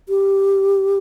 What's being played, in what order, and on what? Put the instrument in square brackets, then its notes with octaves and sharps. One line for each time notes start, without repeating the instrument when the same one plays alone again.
[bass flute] G4